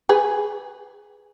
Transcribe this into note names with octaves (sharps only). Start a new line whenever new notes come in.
G#4 B4